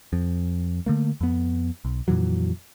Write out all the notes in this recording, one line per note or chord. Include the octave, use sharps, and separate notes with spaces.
F2
D3 A3 A#3
F2 B3
B1
F2 A#2 E3 F#3